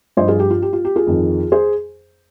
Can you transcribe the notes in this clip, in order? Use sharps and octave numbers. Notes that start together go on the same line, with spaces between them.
G2 F3 C5 D#5
F4 G#4
G4
F4
G4
F4
G4
F4 G#4
F2 D#3
G#4 C5